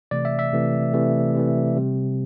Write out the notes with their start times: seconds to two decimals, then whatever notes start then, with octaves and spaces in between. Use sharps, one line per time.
0.11 C3 E3 A3 D5
0.25 E5
0.39 E5
0.53 C3 E3 A3
0.94 C3 E3 A3
1.35 C3 E3 A3
1.77 C3 G3